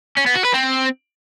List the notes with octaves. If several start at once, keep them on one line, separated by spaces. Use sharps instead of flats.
C#4
B3
F#4
B4
C4